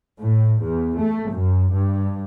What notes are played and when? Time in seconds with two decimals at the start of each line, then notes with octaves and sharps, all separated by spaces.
0.21 A2
0.62 E2
0.97 A3
1.30 F#2
1.72 G2